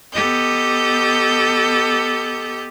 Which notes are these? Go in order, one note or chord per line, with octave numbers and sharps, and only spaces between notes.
B3 G4 A4 D#5 G6